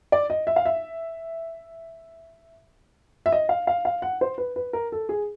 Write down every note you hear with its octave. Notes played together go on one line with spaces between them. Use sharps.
D5
D#5
E5
F5
E5
E5
D#5
F5
F5
F5
F#5
C5
B4
B4
A#4
A4
G#4